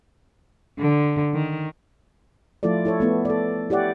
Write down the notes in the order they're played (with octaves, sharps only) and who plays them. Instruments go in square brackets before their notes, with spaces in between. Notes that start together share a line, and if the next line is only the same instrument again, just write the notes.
[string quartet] D3
D#3
[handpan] F3 A3 E4 F4 A4 D5
E4 A4 C#5
A3 B3 E4
A4 D5
E4 G4 C#5 D5 F#5